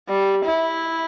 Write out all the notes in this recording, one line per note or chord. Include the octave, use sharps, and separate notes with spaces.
G3
E4